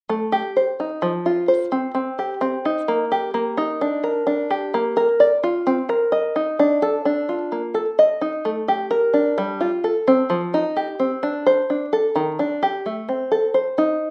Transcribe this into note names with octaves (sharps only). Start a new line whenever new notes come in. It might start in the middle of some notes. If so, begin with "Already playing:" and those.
A3
G4
C5
D#4
F3
F4
C5
C4
C4
G4
C4
D#4
A#3
G4
A#3
D#4
D4
A#4
D4
G4
A#3
A#4
D5
F4
C4
A#4
D#5
D#4
D4
A4
D4
F4
A#3
A4
D#5
D#4
A3
G4
A#4
D4
G3
F4
A4
C4
F3
D#4
G4
C4
D4
C5
D4
A4
D#3
D4
G4
A3
C4
A4
C5
D#4